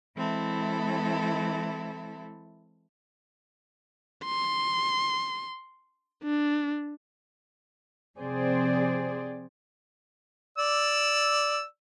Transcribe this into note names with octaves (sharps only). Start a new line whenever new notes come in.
E3 G#3 C4 E4 A4
C6
D4
C3 F3 C4 G#4 C5 D5
D5 E6